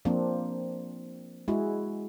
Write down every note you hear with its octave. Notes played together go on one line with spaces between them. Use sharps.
F3 A#3 C4 D4
G#3 E4 F#4 G#4